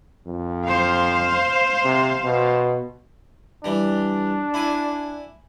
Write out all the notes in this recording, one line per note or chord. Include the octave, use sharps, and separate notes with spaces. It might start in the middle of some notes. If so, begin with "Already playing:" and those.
F2
C5 F5
C3
B2
E3 G3 D4
E4 G#5